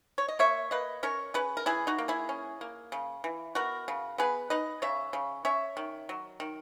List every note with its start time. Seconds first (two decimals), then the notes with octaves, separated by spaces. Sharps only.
0.18 C#5
0.28 D#5
0.39 A#3 C#5 E5
0.71 A#3 B4 D#5
1.03 C#4 A#4 C#5
1.34 C#4 G#4 B4
1.57 A#4
1.66 E3 E4 G#4
1.87 D#4 F#4
1.98 A#3
2.08 E4 G#4
2.29 C#4
2.61 A#3
2.92 C#3
3.24 E3
3.55 B3 F#4 A#4
3.88 C#3
4.18 B3 G#4 B4
4.50 D#4 B4 D#5
4.82 C#3 C#5 E5
5.13 C#3
5.45 C#4 C#5 E5
5.77 D#3
6.09 F#3
6.40 D#3